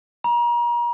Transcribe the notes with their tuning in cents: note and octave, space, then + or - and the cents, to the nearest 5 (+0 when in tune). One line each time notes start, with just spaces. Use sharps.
A#5 +35